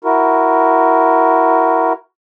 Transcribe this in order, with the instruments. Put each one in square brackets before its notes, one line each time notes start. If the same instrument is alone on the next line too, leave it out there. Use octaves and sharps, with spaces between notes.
[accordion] E4 F#4 A#4